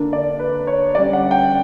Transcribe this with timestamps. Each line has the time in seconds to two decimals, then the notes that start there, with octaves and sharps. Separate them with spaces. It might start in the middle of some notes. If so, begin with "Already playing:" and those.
Already playing: D3 A#3 D4
0.13 D5
0.39 B4
0.67 C#5
0.95 D3 G3 C#4 D5
1.13 F#5
1.31 G5